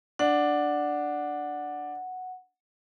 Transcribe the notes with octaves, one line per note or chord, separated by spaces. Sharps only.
D4 F#5